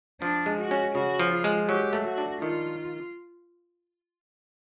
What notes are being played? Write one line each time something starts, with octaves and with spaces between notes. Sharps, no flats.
F3 D4
G#3
F#4
C#4
C#3 F#4
F3
F4
G#3
F#3 G4
A3
F#4
D4
D#3 F4